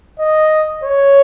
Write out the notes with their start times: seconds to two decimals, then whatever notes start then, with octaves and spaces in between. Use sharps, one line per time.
0.20 D#5
0.84 C#5